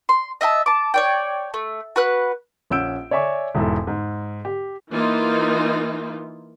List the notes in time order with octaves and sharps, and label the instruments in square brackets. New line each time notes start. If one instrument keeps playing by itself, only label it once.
[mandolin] C6
D#5 E5 G5 A5
A5 D6
C#5 D5 G5
A3
F#4 B4 F#6
[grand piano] A#1 C#4 F#5 E6 G6 D7
C#5 D5 E5 G#5 C#6 D6
E1 G#2 E4 A4
G#2
G4
[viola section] E3 A#3 D#4 F4